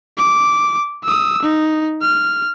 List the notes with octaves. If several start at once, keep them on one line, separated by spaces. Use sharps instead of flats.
D6
D#6 E6
D#4
F6